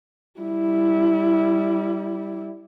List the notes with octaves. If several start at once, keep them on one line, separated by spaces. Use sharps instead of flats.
G3 E4